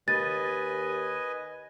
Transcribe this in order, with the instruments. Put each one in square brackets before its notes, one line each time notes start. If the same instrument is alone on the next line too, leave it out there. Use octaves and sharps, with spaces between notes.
[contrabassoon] D#2 [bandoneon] B4 D#5 G#5 [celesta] A6